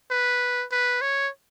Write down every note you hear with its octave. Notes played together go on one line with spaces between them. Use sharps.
B4
B4
C#5